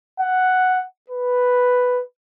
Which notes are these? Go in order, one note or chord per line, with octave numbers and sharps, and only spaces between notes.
F#5
B4